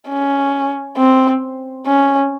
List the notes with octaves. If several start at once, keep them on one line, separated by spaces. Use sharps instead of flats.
C#4
C4
C#4